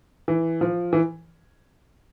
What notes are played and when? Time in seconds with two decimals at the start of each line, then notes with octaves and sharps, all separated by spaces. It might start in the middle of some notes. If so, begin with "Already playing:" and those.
0.28 E3
0.61 F3
0.93 E3